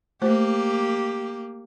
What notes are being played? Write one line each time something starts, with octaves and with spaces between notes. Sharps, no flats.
A3 A#3 G4 C5